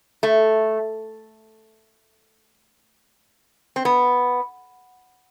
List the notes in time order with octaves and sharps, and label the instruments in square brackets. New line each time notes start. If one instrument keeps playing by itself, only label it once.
[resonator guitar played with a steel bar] A3
C4
B3